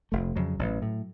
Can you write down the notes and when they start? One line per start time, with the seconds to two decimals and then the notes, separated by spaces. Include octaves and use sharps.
0.12 F1 A3
0.36 F2 C#3 F#3
0.59 A1
0.82 A2